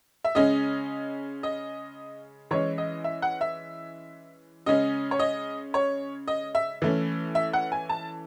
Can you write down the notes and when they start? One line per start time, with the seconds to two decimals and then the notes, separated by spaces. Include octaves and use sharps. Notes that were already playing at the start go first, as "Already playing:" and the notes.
0.24 E5
0.35 C#3 G#3 C#4 D#5
1.43 D#5
2.51 E3 G#3 C#4 C#5
2.78 D#5
3.04 E5
3.22 F#5
3.41 E5
4.66 C#3 G#3 C#4 D#5
5.11 C#5
5.19 D#5
5.74 C#5
6.28 D#5
6.55 E5
6.82 E3 A3 C#4
7.35 E5
7.53 F#5
7.72 G#5
7.89 A5